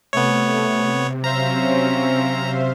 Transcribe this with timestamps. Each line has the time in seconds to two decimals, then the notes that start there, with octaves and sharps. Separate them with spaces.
0.13 C3 A3 B3 C#5
1.24 F#3 C4 C#4 C5 E5 F5 A#5